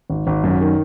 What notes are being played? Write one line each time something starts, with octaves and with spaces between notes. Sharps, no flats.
G#1
G#1
F#2
D#3